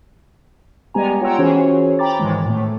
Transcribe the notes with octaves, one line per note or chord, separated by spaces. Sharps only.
G3 G#3 B3 G4 G#5 A#5
F4 C#5 F#5 G5 A#5 E6
E3 C#4 F#4 G#4 C5 C#5
G5 A#5 B5 D6 A6
G#2 D#3 E3 G#3
A2 A3